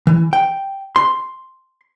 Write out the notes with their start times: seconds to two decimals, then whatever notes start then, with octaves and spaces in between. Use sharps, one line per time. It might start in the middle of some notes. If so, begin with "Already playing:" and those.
0.07 E3
0.33 G5
0.96 C6